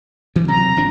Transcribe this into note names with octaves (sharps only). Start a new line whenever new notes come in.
D2 E3
C3 F#3 A#5
G#1 F3 D4